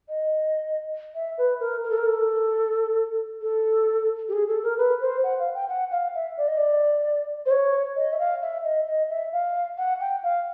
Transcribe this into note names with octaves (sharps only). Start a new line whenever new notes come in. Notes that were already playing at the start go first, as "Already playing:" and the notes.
D#5
E5
B4
A#4
A#4
A4
A#4
A4
A4
G4
G#4
A4
A#4
B4
C5
F#5
F5
G5
F#5
F5
E5
D5
D#5
D5
C5
C#5
D#5
E5
F5
E5
D#5
D#5
E5
F5
F#5
G5
F5